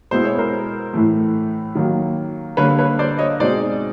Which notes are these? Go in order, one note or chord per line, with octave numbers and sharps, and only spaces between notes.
B2 G#3 B3 E4 C5
C#5
A#4 C5
A2 E3 A3
D#3 F#3 A#3
D3 G3 A#3 B4 C#5
B4 C#5
C5 D5
C#5 D#5
B2 G#3 C4 D#4 C5 D5